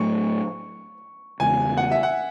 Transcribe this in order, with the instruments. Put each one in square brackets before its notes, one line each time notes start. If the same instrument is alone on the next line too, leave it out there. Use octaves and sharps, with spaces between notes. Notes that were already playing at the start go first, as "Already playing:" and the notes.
Already playing: [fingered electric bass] A2 F#3 A3 [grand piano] C#6
[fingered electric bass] E2 C#3 G#3 B3 [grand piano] G#5
[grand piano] F#5
E5
F#5